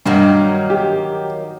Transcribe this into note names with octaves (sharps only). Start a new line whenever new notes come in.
G2 D#3 F#3 A#3
G4